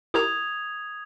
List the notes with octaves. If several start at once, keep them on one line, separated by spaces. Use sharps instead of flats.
E4 G4 A#4 D#6 G#6 F7